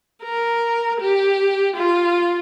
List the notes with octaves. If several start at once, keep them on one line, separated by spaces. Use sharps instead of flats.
A#4
G4
F4